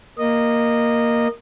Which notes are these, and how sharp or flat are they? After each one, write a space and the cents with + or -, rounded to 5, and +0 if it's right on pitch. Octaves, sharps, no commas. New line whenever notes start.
A#3 +0 D#5 -15